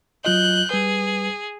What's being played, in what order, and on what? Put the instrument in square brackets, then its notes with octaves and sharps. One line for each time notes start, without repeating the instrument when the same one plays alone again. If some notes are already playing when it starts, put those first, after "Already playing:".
[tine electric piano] F#3 F4 D#5 [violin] F#6 G6
[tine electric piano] G3 B4 [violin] G#4